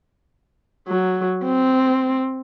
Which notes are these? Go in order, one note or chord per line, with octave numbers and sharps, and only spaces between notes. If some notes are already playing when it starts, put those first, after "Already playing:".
F#3
C4